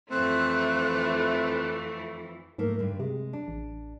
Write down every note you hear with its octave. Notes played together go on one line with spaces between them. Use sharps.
F2 E3 A3 C4 F#6
G#2 F3 A3 A#3
G2 D3
C3 G#3
D4
A1